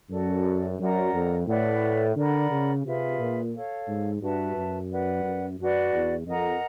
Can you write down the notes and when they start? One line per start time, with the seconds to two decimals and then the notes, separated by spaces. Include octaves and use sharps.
0.11 F#2 F#4 A4 D5
0.79 F#2 A#4 D5 F#5 A#5
1.13 F2
1.48 A2 B4 D5 F#5
2.16 D3 A#4 D5 F#5 B5
2.50 C#3
2.84 C3 F4 G#4 B4 E5
3.19 A#2
3.53 A4 C#5 F5
3.88 G#2
4.21 G2 F#4 B4 E5 A5
4.55 F#2
4.90 B4 D5 F#5
5.24 F#2
5.58 F#2 D4 F#4 B4 D5
5.93 E2
6.27 F2 A#4 D#5 F#5 A#5